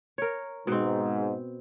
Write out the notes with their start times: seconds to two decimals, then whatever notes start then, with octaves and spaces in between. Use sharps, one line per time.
0.18 A#4 C#5
0.67 G#2 B2 C4